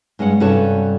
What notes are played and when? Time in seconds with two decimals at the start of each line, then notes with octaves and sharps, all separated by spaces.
0.19 G2 G#3 C#4 F#5
0.40 G2 C3 C#4 F#4 A4 A5